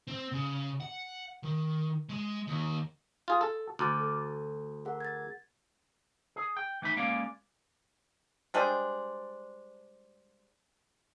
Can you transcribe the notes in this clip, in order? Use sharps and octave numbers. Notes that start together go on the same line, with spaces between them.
C4
C#3
F#5
D#3
G#3
D#2
F4 G#4
A4
D2 D6 F6 A6
A4
G#4 A#4 F#5
G#6 A6
G#4
G5
E3 A3 D#4 B5
G#3 A#3 C#4 D5 F5
G3 G#3 D4 C5